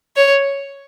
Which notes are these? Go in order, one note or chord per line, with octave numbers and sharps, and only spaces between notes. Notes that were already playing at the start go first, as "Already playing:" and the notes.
C#5